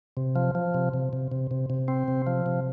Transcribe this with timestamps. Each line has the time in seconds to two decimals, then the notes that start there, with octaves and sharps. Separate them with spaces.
0.17 C3
0.36 F3
0.55 F3
0.74 C3
0.94 C3
1.13 C3
1.32 C3
1.51 C3
1.70 C3
1.88 C4
2.08 C3
2.27 F3
2.46 C3